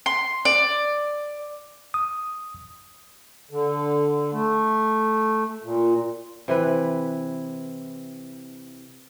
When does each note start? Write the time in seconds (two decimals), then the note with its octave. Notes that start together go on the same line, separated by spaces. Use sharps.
0.06 C6
0.45 D5
1.94 D#6
3.51 D3
4.32 A3
5.63 A#2
6.48 C3 E3 B4